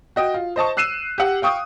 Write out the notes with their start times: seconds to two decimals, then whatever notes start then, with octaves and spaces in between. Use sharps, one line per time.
0.16 F#4 D#5 G5
0.34 F4
0.56 C5 D#5 A5 C#6
0.77 E6 F#6 C7 D#7 E7
1.18 G4 F#5
1.42 F5 G5 C#6 D#6